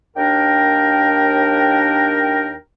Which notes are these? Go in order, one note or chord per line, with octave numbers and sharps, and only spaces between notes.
D#2 D4 A#4 G5